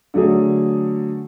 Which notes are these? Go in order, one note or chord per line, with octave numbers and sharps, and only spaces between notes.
D3 F#3 A3 G#4